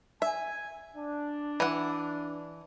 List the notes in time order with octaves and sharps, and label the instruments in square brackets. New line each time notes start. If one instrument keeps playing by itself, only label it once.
[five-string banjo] E5 [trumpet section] G#5
[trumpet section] D4
[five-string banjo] E3 F#5